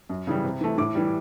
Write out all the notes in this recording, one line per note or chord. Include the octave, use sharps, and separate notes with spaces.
F#2
C#3 E3 G3
C3
E3 A3
A2 D6
E3 G3